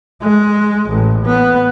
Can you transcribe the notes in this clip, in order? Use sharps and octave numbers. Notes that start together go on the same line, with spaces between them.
G#3
A1
B3